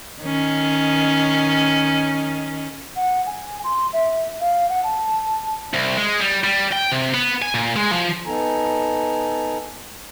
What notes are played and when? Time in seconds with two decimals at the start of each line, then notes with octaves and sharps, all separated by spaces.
0.22 D#3 C#4
2.96 F#5
3.26 G#5
3.64 C6
3.93 E5
4.40 F5
4.69 F#5
4.83 A5
5.74 C2
5.97 G#3
6.20 G3
6.44 G3
6.73 G5
6.92 C3
7.14 B3
7.42 G#5
7.55 A#2
7.76 G#3
7.92 F3
8.26 B3 D#4 A4 G#5 A#5